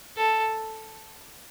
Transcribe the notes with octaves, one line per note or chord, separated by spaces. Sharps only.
A4